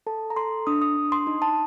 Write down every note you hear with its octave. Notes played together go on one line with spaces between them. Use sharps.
A4 A5
A#5
A4 C6
D4 D#6
D#6
D4
C6
D#4
A5